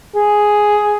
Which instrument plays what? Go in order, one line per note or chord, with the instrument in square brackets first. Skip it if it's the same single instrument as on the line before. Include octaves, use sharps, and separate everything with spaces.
[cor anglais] G#4